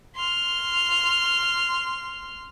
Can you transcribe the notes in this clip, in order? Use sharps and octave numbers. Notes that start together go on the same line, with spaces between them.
C6 F6